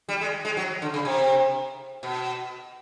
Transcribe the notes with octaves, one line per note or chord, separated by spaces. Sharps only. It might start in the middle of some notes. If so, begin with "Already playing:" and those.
G3
G#3
G#3
F#3
D3
C#3
C3
B2